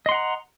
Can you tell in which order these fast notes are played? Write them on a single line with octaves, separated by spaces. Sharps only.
D#5 C6 F#5 A#5